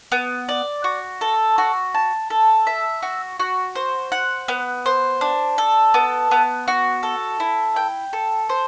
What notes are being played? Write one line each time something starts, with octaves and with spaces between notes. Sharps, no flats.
B3
D5
F#4
A4
F#4
A5
A4
E5
F#4
F#4
C5
F#5
B3
C5
D4
A4
B3
B3
F#4
A4
E4
G5
A4
C5